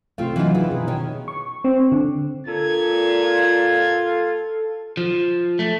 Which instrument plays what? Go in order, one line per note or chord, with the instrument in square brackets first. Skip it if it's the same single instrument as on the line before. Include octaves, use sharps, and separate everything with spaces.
[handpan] C3 F4 F5 [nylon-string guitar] A3 C4
[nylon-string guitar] E3 F#3 D#4
[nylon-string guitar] C4 E4 [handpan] F4 G#4 B4
[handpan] B2 D#4 G#4
[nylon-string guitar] D#3 C#4 [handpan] C#5
[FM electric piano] C#6
C4
D3
[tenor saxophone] A#2 [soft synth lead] A4 [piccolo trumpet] G#6
[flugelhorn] F4
[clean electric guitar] F3
A3